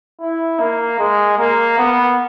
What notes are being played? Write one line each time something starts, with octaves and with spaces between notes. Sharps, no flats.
E4
A#3
G#3
A#3
B3